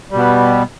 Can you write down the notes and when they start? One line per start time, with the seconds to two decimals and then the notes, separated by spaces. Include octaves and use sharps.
0.11 G3
0.15 B2
0.18 B3